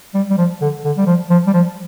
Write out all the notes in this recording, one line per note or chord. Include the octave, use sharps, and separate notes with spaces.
G3
G3
F3
D3
D3
G3
F3
F3
G3
F3